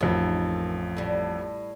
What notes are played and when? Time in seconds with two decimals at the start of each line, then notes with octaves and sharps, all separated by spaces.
0.01 A1 F2 D#3
0.97 A2 G3